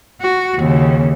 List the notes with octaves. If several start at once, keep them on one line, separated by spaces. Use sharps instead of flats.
F#4
D#2 C#3